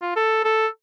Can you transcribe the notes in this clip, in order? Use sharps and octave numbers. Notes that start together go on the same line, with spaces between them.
F4
A4
A4